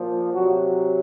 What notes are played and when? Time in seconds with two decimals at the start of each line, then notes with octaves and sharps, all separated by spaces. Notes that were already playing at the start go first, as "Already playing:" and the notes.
Already playing: A#2 F3
0.34 C3 F#3 F#4